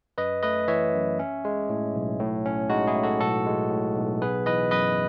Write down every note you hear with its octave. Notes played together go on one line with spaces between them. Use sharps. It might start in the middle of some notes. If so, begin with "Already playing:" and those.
F#2 B4 D#5
A3 B4 D#5
E3 C#5 E5
F#2
C#4
G#3
A2
B1
A2
C#4
G#3 D#4 F#4
E4 G#4
A2
F#4 A4
B1 F#4 A4
G#3
A2
B1
B3 G#4 B4
E3 B4 D#5
F#2 B4 D#5